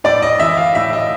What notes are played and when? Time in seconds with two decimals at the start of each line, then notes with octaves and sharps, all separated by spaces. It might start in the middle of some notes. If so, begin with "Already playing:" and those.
0.04 A2 D5
0.22 D#5
0.40 E3 E5
0.57 F5
0.75 A2 E5
0.93 D#5